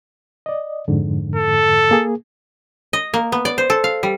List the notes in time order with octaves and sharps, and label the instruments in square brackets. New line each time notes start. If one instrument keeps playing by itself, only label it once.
[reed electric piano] D5 D#5
F2 G#2 D3
[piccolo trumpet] A4
[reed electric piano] A#3 G#4
[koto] D#5
A#3
B3
D5
C5
A4
F5
G3